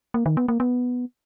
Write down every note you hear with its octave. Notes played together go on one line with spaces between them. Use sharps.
A#3
D#3
B3
A#3
B3